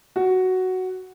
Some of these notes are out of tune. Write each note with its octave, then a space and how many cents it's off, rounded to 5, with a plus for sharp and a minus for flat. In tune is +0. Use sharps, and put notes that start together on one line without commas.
F#4 +5